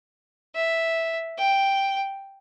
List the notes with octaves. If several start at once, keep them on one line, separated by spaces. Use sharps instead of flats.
E5
G5